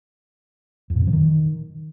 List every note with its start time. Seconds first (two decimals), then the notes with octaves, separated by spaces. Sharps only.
0.90 F2
0.96 A#2
1.01 C3
1.07 F3
1.13 D#3